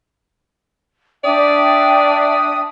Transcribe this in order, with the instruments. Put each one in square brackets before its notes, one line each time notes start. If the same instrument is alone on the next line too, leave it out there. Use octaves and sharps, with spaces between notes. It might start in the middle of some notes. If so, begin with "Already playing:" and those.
[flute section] D4 E5 G5 [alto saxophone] D5 [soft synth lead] D#6